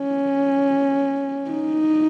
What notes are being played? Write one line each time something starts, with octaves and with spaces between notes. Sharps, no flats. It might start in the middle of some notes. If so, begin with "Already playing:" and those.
Already playing: C#4
D#4